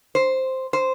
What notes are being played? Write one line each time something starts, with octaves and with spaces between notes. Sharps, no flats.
C5
C5